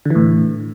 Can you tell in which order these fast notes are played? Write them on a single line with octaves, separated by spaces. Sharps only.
D3 E3 A2